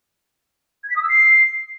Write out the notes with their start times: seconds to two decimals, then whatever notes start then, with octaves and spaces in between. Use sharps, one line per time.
0.83 G#6
0.89 B6
0.96 D#6
1.02 E6
1.08 C7